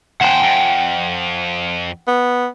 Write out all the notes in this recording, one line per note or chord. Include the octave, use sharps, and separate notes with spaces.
D#2 C5 F#5 G5
F2
B3